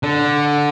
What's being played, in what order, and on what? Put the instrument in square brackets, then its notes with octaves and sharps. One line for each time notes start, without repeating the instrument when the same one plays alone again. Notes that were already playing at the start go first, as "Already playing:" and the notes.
[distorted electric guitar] D3